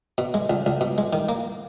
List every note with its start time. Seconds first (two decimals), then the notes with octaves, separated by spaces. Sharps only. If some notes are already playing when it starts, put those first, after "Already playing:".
0.18 B2
0.34 G#3
0.50 C#2
0.66 C#2
0.81 B2
0.98 G#3
1.13 D#3
1.29 A#3